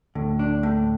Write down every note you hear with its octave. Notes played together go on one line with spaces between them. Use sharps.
D2 A2 D3
D4
A2